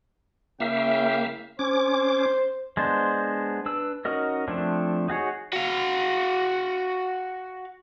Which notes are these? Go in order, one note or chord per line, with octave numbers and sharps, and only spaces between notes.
C#3 A#3 E4 E5 F5 G5
C#4 C5 D6
G#3 B3 D4 C5
D4 B4 E6
C#4 D#4 F#4 A#4 D#5
F3 A3 C4 D4 E4
D#4 F#4 G#4 C#5
F#4 F5